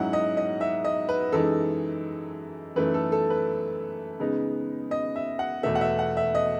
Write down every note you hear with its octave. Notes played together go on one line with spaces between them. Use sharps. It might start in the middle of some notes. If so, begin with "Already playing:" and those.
Already playing: G#2 F#3 C#4 E4 F#5
D#5
D#5
E5
D#5
B4
F#2 E3 G#3 D#4 A4
F#2 E3 A3 D#4 B4
A4
A4
B4
C#3 G#3 B3 D#4
D#5
E5
F#5
E2 B2 A3 E5
F#5
E5
F#5
E5
D#5